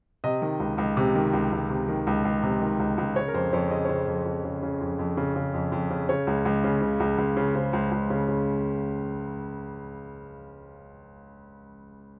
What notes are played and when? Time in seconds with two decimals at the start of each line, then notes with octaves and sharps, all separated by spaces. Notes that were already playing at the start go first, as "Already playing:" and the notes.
0.24 C3 D#5
0.42 D#3
0.60 C#2
0.78 C#2
0.97 C3
1.15 D#3
1.33 C#2
1.52 C#2
1.70 C3
1.88 D#3
2.07 C#2
2.25 C#2
2.43 C3
2.61 D#3
2.80 C#2
2.98 C#2
3.16 C#3 C#5
3.28 A#4
3.34 F2 C5
3.53 F2 C#5
3.71 C#3 D#5
3.85 C#5
3.89 C#3 C5
4.08 F2
4.26 F2
4.44 C#3
4.63 C#3
4.81 F2
4.99 F2
5.17 C#3
5.36 C#3
5.54 F2
5.72 F2
5.90 C#3
6.09 C#3 C#5
6.27 C#2
6.45 C#2
6.64 C#3
6.82 C#3
7.00 C#2
7.18 C#2
7.37 C#3
7.55 C#3 C5
7.73 C#2
7.92 C#2
8.10 C#3
8.28 C#3